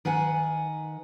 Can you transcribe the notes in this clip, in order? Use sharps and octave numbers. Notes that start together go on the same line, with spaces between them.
D#3 B4 F#5 G#5